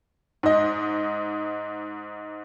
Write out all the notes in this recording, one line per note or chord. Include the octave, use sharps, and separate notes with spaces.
G#2 D#5